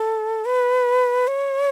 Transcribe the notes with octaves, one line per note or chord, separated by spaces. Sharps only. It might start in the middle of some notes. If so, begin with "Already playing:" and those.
Already playing: A4
B4
C#5